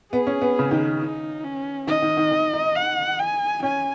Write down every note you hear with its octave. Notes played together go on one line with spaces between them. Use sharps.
B3 G#4
C#4
B3
C#3
D#3
D#4
C#4
D#3 D#5
D#3
D#3
D#3
D#4
F#5
G#5
C#4 G#5